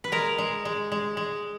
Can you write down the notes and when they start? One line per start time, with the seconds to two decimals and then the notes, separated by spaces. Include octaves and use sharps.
0.04 B4
0.12 G#3 A#4
0.38 G#3
0.65 G#3
0.92 G#3
1.17 G#3